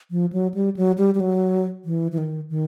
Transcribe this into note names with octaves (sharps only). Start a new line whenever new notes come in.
F3
F#3
G3
F#3
G3
G3
F#3
E3
E3
D#3
D#3